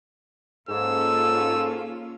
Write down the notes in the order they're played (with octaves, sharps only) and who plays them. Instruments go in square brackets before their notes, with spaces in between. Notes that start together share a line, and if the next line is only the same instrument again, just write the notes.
[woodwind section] G#2 [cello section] A#3 C#4 F4 [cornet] A4 [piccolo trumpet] E6